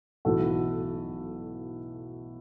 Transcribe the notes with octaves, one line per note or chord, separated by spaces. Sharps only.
B1 A2 E3 F#4 A4